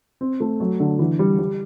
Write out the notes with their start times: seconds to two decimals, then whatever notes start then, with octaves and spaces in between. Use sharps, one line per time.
0.21 C4
0.40 A3
0.60 F#3
0.80 D3
0.99 E3
1.19 G3
1.39 G3